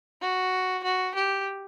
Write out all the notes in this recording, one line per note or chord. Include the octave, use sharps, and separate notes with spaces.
F#4
F#4
G4